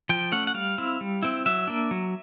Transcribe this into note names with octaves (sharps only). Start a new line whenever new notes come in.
F3 G5
A3 C#4 F#5
F#5
G3 F5
C4 E4
G3
C4 E4
F#3 E5
A#3 D4
F#3